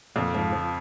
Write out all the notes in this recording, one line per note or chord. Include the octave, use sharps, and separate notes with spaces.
F2 A#2
G#2 F3
F3